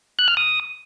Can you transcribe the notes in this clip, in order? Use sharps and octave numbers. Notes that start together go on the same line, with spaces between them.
F#6
F6
D#6